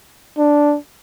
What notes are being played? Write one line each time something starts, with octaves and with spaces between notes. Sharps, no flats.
D4